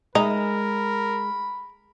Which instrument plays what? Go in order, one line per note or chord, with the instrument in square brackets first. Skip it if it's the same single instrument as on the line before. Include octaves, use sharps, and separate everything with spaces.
[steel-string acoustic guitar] G#3 [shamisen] D#4 [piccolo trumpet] A#4 [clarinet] B5